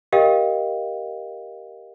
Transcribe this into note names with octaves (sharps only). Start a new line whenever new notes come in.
G4 A#4 D#5 F5 G5